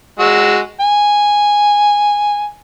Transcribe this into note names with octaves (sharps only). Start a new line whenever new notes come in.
G#3 F#4 E6
G#5